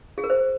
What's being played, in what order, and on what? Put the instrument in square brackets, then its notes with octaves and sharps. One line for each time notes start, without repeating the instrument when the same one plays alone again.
[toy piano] G#4
A#4
C5